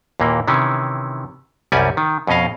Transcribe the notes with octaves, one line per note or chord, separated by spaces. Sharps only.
D#2 A#2 E3 A#3
C3 D#3 E3 C#4
C2 F#2 G3 C#4 D5 G#5
D#3
F2 B2 C#4 D#5 F5